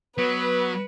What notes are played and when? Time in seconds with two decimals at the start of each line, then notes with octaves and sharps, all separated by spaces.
0.18 F#3 B3 B4